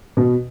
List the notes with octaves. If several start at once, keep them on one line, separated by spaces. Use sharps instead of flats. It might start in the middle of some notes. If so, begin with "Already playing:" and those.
B2